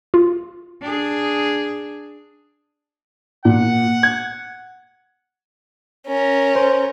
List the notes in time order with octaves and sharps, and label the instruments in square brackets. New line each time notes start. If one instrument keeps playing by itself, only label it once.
[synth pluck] F4
[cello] D4 G#4
[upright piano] A#2 [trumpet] F#5
[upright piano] G#6
[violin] C#4 A#4
[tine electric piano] C5